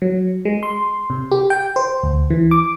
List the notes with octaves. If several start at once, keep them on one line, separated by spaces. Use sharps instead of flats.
F#3
G#3
C6
C3
G4
G5
C5
D2
E3
D6